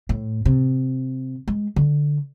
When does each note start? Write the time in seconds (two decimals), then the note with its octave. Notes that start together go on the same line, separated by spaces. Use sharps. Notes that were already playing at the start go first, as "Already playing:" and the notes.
0.09 A2
0.45 C3
1.48 G#3
1.76 D3